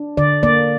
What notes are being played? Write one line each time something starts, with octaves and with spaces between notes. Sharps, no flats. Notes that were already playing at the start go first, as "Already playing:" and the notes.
Already playing: D4
D3 D5
A#3 D5